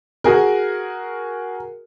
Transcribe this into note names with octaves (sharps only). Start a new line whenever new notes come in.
F#4 G#4 A#4